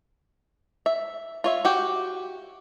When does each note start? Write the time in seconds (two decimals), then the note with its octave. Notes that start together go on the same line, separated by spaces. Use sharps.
0.86 E5
1.44 F4 C#5 E5
1.65 F#4 G4